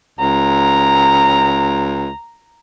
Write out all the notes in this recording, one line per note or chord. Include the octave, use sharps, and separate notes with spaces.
C#2 A#5